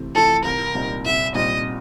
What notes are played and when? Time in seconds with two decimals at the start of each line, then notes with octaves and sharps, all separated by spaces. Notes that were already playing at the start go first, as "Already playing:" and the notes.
Already playing: C3 E3 A3 C4
0.15 E3 A3 C4 F4 A4
0.45 C2 A#4
0.75 A#2 G3 C4 D#4
1.06 C2 E5
1.35 A#2 G3 C4 D#4 D#5